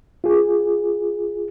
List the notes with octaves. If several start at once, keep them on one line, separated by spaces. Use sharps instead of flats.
F4 G#4